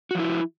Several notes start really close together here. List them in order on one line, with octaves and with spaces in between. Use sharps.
F#4 F3 E4